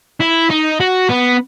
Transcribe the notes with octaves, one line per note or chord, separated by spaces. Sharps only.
E4
D#4
F#4
B3